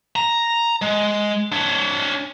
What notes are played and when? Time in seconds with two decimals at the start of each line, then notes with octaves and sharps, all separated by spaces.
0.16 A#5
0.82 G#3
1.52 D4 C#5